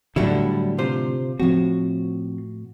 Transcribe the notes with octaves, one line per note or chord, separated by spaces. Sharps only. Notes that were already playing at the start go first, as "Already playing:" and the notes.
A2 D3 F#3 G3 E4
C3 F4 C5
A2 F3 C4 F#4